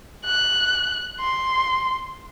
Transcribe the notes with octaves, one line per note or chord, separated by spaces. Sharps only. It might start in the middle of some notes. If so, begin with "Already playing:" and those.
F#6
C6